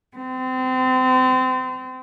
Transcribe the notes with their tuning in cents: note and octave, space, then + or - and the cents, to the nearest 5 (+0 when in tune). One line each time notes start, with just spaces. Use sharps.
C4 -30